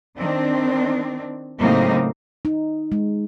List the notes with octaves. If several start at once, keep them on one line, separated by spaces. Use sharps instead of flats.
D#3 C4 D4
A2 C#3 F#3 A#3 C4 D#4
D#4
G#3